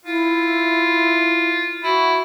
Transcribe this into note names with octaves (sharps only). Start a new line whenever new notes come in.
E4 F4
E4 F#4